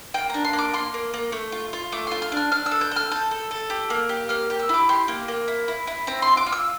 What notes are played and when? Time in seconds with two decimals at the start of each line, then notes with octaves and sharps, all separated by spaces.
0.14 A#3 G5
0.30 D4 A#5
0.45 C6
0.53 A#3
0.59 D6
0.73 A#3 C6
0.94 A#3
1.14 A#3
1.32 A3
1.52 F4
1.73 F4
1.92 A3 D6
2.07 F4 C6
2.22 F6
2.32 D4 F6
2.52 D4 F6
2.66 E6
2.71 A4
2.81 G6
2.92 A4 F6
3.11 A4 G6
3.31 A4
3.51 A4
3.70 G4
3.90 A#3
4.09 G4
4.29 A#3 F6
4.50 G4
4.59 E6
4.69 E4 D6
4.89 G4 C6
5.08 A#3
5.28 A#3
5.48 E4
5.68 E4
5.87 E4
6.07 C4 A#5
6.22 F4 C6
6.37 D6
6.47 F4
6.52 E6